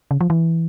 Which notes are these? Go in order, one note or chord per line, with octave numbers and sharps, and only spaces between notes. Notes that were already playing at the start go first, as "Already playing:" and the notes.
C#3
F3
E3